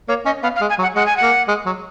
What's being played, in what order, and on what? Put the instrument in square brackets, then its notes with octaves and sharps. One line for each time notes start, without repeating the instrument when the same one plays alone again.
[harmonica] A#3 [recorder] C#5
[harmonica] C#4 [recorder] D#5
[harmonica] B3 [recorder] F5
[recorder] F5
[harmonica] G#3
[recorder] G#5
[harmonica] F#3
[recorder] F#5
[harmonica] G#3 [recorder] F#5
[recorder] G#5
F#5
[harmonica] A#3
G#3
F#3